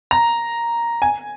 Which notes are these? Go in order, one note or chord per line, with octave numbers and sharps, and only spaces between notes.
A#5
G#5